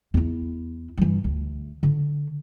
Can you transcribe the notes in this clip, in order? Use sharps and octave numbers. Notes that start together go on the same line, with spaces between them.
E2 E4
G2 E3
D2
D3